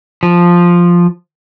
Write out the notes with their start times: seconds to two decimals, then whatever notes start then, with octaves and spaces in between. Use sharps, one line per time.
0.23 F3